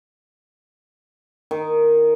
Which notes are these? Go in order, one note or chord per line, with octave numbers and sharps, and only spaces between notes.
D#3